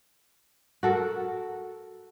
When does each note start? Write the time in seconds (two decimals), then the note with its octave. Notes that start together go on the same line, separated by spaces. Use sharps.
0.83 F#4 A4 A#4